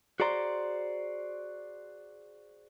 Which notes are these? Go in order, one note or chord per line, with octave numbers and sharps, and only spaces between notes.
F#4 G#4 C5 D5 A#5 C6